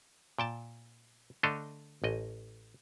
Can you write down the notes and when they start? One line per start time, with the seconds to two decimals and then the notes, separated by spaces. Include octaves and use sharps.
0.39 A#2 G5 A5
1.43 D3 A3 D4 A4 D#5 F5
2.04 A1 D#5